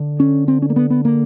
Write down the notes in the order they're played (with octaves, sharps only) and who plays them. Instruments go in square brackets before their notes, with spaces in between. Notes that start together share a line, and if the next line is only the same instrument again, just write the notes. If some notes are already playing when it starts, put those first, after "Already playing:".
Already playing: [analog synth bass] D3
[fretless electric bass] C#4
C4
C#4
A#3
B3
B3
A#3